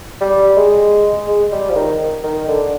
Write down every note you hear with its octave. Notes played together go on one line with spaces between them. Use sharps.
G3
G#3
G#3
G3
F3
D#3
D#3
D3